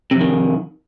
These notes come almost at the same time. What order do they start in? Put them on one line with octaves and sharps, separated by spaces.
C3 F2 D#3